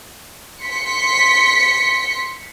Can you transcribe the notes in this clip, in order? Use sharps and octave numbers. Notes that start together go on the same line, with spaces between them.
C6 B6 C#7